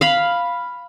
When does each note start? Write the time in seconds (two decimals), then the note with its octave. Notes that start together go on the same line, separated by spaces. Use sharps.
0.01 F5 B5